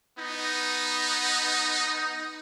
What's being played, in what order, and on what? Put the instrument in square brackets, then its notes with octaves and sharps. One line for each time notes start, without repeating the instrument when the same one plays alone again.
[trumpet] B3 [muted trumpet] D#4